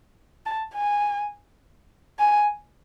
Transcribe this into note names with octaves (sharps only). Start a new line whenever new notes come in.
A5
G#5
G#5